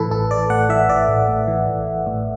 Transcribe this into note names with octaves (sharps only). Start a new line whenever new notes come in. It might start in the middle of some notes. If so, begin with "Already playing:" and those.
Already playing: A2 E3 A4 B4
A1 A4
A1 D5
A2 F#5
E3 E5
A1 D5
A1
A2
E3
A1
A1
A2